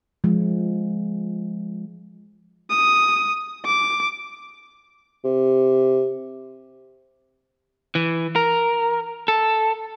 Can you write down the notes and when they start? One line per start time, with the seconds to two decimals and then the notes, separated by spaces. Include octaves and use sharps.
0.24 F3 G#3
2.70 D#6
3.66 D6
5.24 C3
7.95 E3
8.36 A#4
9.28 A4